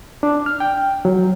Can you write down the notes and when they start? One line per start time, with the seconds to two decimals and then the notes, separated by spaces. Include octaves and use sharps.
0.23 D4
0.46 F6
0.60 G5
1.05 F#3